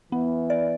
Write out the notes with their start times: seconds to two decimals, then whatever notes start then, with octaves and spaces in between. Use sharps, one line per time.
0.12 E3 B3
0.50 D5